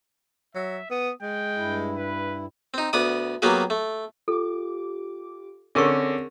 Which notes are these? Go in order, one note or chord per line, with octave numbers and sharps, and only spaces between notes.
F#3 E5
B3 D#6
G#3 G5
G2 E4
B4
C4 D#4
D2 B3 D5 D#6
F#3 A#3 B3 G4 G#4
A3
F4 G4 A4 D6
D3 C4 C#4 G#4 A#4 C#6 A#6